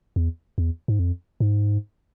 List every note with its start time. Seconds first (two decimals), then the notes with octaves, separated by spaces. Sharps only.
0.16 E2
0.58 E2
0.88 G#2
0.99 F2
1.40 G#2